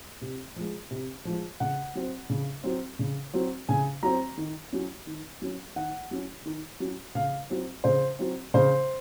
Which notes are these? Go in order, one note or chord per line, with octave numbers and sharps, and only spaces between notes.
C3
F3 G#3
C3
F3 G#3
C#3 F#5
F#3 C4
C#3
F#3 C4
C#3
F#3 C4
C#3 G#5
F#3 C4 A#5
D#3
F#3 C#4
D#3
F#3 C#4
D#3 F#5
F#3 C#4
D#3
F#3 C#4
C#3 F5
F#3 C4
C#3 C5
F#3 C4
C#3 C5